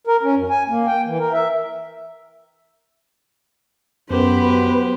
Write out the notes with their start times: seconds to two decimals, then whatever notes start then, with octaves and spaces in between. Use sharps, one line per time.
0.07 A#4
0.23 C#4
0.35 F#2
0.50 G#5
0.68 A#3
0.87 G5
1.06 E3
1.20 A#4
1.33 E5
4.10 F#2 B3 G4 B4 C5